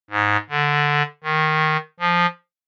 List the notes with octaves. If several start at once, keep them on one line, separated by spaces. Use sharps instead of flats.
G#2
D3
D#3
F3